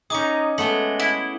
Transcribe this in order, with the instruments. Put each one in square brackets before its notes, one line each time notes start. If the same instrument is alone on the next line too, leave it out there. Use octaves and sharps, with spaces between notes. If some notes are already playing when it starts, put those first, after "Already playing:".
[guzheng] C#4 G#4 [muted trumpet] D#4 [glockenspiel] D6 D#6
[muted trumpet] G#3 [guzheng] A3 B3 G#4 [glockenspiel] F#7 G7
[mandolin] E4